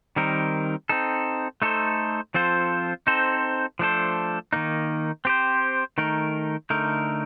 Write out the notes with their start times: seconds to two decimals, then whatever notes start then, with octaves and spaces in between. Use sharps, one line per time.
0.16 D#3 G3 C4 D#4 A#4
0.89 C4 D#4 A4
1.62 A3 D#4 A4 C5
2.34 F3 C4 F4 A4 C5
3.07 C4 D#4 A4 C5
3.79 F3 A3 D4 A4 C5
4.53 D#3 A#3 D#4
5.25 C4 G4 C5
5.98 D#3 A3 D#4 A#4
6.70 D3 A3 D#4 A#4